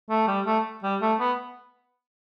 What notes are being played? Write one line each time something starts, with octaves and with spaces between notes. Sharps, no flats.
A3
G3
A3
G3
A3
B3